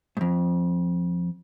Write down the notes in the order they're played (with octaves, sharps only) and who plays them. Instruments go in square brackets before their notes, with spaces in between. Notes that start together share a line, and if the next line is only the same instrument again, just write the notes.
[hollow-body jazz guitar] F2 G#2